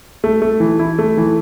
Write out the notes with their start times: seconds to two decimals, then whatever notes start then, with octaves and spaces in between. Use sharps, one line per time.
0.24 A3
0.42 A3
0.60 E3
0.79 E4
0.99 A3
1.17 E3